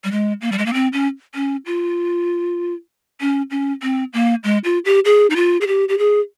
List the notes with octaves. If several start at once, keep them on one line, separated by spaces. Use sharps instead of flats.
G3
G#3
A#3
G3
G#3
A#3
C4
C#4
C#4
F4
C#4
C#4
C4
A#3
G#3
F4
G4
G#4
D#4
F4
G#4
G4
G4
G#4